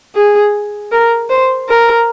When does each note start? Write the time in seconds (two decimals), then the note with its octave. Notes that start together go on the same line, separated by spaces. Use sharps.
0.15 G#4
0.92 A#4
1.30 C5
1.69 A#4